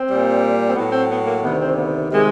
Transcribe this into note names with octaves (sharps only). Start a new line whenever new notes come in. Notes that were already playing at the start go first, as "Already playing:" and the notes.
Already playing: C4
A#2 G3
C4
A2 F#3 B3
C4
B3
A#3
D2 C3 D#3 B3
C4
B3
C3 D#3 G#3